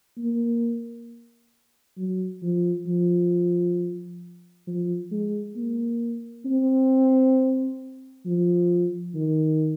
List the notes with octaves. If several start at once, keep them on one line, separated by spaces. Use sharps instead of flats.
A#3
F#3
F3
F3
F3
G#3
A#3
C4
F3
D#3